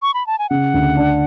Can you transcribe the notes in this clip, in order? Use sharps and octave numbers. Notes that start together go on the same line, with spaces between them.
C#6
B5
A5
G#5
C#3 F#5
D2
D4